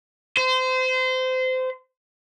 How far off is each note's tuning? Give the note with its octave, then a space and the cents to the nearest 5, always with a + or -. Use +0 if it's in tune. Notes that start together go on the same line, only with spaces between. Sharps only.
C5 -25